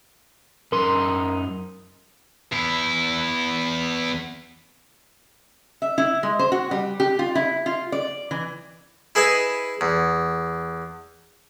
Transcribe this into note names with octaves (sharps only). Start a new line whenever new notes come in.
F#2 D#4 A#4 C6
E2 E4
E5
E4
G#3
C5
F#4
G3
G4
F4
E4
F4
D5
E3
E4 G#4 B4 D#5 E5
E2